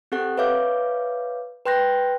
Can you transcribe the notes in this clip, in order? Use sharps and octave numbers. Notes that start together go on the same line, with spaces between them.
C4 G4 A4 F#5 F#6
B4 C#5 E5 F5 D6 G6
B4 G5 C6 F#6 G6 A#6